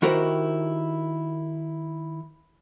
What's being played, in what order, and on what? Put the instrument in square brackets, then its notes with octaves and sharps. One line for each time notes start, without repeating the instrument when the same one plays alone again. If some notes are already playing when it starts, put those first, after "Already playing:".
[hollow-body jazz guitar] D#3 E4 F#4 G4 A#4 C5